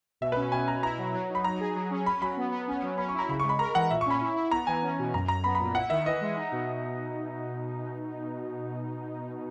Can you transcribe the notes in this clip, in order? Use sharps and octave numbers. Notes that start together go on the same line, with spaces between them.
B2 E5
C#4 B4
B2 G#5
B2 A#5
E4 A#5
F#3
F#3
D#4
B5
F#3 A#5
G#4
F#3
C#4
C#4 B5
F#3 B5
B3
B3
C#4
F#3
C#4 B5
C#6
E4 A#5
C#3 B5
C#6
G#3
B5
A#4 A#5
E3 F#5
A#2 E5
C#6
C#4 B5
E4
E4
B3 A#5
E3 G#5
C#4
B2
F#2 A#5
F#2 A#5
B3 B5
B5
A#2
E4 F#5
D#3 E5
E3 D#5
G#3
D#4
B2